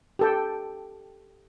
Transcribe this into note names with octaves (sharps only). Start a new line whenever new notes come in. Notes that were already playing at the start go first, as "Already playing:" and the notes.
G4 A4 G5